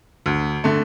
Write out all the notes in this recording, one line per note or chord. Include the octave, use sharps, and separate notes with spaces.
D2
D3 A3